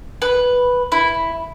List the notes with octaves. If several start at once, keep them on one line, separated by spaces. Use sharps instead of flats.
B4
E4